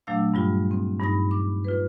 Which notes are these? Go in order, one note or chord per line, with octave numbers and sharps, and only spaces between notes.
A#2 F#3 A3 D4 F5 E6
G2 G3 F4
C4
G2 D#4 B5 A#6
D6
F4 B4